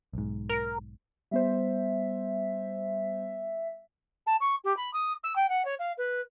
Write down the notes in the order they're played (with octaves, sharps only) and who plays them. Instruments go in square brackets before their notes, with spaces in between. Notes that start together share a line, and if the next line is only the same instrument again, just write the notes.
[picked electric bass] B1 G#2
[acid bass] A#4
[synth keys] G3 B3 C5 [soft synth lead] E5
[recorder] A5
C#6
G4
B5
D#6
E6
G5
F#5
C#5
F5
B4